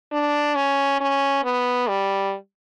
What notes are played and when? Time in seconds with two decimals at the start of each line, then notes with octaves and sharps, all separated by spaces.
0.13 D4
0.56 C#4
1.01 C#4
1.44 B3
1.89 G3